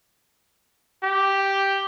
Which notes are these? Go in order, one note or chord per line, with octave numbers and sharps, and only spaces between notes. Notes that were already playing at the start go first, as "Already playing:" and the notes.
G4